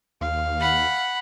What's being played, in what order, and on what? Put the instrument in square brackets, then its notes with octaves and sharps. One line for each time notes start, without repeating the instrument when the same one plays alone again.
[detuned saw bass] D#2 [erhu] F5
[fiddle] F#5 B5